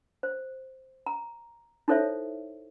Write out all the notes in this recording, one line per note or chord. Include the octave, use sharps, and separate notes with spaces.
C5
A#5
D#4 E4 A4 C5 C#5 E5